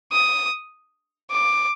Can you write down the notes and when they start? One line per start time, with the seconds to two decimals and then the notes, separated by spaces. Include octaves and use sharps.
0.12 D#6
1.31 D6